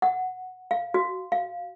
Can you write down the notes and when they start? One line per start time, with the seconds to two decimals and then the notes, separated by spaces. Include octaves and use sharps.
0.02 F#5
0.71 F5
0.94 F#4
1.32 F5